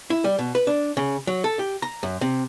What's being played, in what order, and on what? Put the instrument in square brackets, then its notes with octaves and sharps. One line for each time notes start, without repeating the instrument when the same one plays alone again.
[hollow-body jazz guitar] E4
G3
B2
B4
D4
C#3
F#3
A4
G4
A#5
F#2
C3